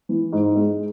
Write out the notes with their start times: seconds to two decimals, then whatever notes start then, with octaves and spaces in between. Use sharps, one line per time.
0.09 E3
0.33 G#2
0.56 G#3